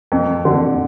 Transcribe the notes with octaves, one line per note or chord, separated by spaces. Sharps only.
F2
D3